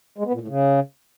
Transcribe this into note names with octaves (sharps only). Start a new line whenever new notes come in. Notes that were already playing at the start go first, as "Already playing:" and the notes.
G#3
B3
A#2
A2
C#3